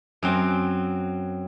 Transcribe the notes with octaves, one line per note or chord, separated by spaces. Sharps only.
F#2 F#3 C4